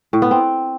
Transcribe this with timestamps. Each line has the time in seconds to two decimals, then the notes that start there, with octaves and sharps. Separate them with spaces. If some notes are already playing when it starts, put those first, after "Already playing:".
0.13 A2
0.22 B3
0.31 C4